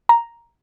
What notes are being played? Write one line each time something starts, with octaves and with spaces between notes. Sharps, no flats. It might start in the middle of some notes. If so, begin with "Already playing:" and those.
A#5